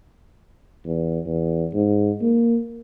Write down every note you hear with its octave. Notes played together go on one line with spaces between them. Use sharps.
E2
E2
G#2
A#3